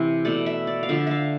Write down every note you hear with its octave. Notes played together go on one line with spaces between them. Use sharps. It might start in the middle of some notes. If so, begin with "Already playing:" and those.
Already playing: C3 E3 C5
B2 A3 D5
E5
D5
F5
D3 F3 A3 E5
E5 F5